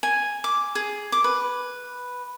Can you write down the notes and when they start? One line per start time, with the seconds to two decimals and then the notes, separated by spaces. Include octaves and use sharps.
0.03 G#5
0.44 D6
0.75 G#4
1.12 D6
1.24 B4